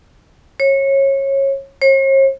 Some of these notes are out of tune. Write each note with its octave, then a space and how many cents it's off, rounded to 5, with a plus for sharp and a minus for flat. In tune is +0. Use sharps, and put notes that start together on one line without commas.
C#5 -25
C#5 -45